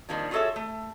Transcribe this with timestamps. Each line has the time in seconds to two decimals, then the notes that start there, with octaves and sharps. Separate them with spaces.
0.09 D#3 F3 G3 A#3 D4
0.31 F4 F#4 G#4 A4 C#5 E5
0.56 A3